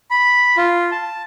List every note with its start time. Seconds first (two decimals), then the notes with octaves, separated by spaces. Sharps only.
0.11 B5
0.57 F4
0.92 A5